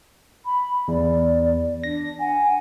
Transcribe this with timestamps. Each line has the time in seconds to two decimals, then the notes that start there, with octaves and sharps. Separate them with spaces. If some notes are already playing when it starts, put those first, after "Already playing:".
0.45 B5
0.88 E2 D5
1.84 D4 A#6
2.20 F#5 G#5